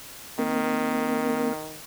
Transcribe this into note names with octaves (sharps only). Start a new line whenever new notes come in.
D#3 A#3 C4 A#4